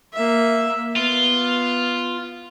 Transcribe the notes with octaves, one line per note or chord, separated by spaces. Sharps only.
A#3 E5
B3 F4